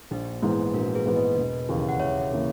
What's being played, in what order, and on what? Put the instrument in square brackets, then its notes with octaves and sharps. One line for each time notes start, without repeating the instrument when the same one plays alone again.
[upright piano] A#1 [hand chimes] D#4
[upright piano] G#2 E3 B3 [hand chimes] E4
[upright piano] A#1 [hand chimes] F#4 A#4
[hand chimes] G#4 B4
[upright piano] G#2 E3 B3
[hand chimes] B4 D#5
[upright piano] E1
D#2 C#3 E3 A#3
[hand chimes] F#5
[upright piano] E1 [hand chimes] C#5 E5
[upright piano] C#3 E3 A#3